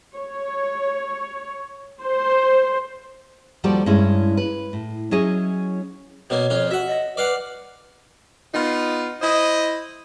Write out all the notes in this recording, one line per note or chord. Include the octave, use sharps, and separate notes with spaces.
C#5
C5
D#2 F3 G3 F#4 A4 D5
G2 G#3 C#4 E4
B4
A2
F#3 C#4 E4 G#4 D#5
B2 A#3 C#5
F2 F4
F#4 E5 F#5
D#5
B4 D5 F5 F#5
B3 D#4 F4
E4 C5 D#5